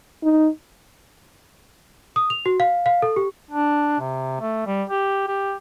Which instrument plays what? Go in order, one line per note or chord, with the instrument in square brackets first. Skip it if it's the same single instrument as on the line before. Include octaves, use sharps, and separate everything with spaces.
[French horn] D#4
[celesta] D#6
F7
F#4
F5
F5
A4
G4
[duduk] D4
C3
A3
G3
G4
G4